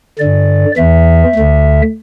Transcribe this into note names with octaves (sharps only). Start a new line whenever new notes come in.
G2 D3 D5
E2 E3 E5
D2 D3